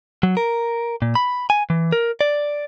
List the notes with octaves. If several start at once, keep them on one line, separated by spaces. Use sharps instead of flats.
F#3
A#4
A#2
B5
G#5
E3
A#4
D5